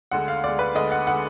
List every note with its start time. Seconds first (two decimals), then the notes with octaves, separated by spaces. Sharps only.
0.11 D2 D3 G#3 F#5
0.28 F5
0.44 D2 D3 G#3 D5
0.59 B4
0.75 D2 D3 G#3 D#5
0.92 F#5
1.07 D3 G#3 F#5